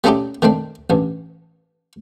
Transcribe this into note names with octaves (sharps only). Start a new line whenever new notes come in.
G3 A3 C#4 D#4 E4 G4
D#3 A3 C4 D4
A1 G2